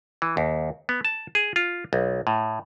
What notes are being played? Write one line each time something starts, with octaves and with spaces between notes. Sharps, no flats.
E3
D#2
B3
A5
G#4
F4
B1
A2